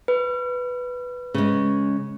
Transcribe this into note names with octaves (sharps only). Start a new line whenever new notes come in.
B4
C#3 G#3